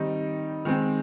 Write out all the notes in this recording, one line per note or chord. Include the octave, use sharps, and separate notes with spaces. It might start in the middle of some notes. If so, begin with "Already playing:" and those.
Already playing: D#3 G3 C4 D#4
D#3 G#3 C4